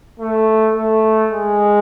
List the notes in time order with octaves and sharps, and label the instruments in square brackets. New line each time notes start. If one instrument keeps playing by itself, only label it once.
[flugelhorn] A3
A3
G#3